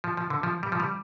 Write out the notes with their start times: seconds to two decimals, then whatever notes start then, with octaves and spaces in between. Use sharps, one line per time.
0.04 F3
0.17 F3
0.30 D3
0.43 F3
0.63 G3
0.72 F3
0.80 G3